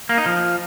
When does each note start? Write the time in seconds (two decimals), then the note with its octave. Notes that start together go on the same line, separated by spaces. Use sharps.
0.09 A#3
0.18 D#4
0.26 F3